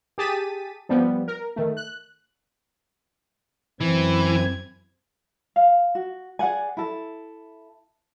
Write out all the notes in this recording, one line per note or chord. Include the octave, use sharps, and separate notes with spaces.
G4 G#4 A5 A6 B6 D#7
F3 G3 B3
A#4
D#3 A3
F#6
F#2 E3 C4 G#6
F5
F#4
G#4 D5 F#5 G#5
E4 A4